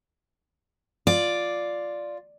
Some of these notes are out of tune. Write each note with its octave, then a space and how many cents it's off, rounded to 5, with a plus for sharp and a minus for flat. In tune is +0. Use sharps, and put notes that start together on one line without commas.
F4 +0 D5 +0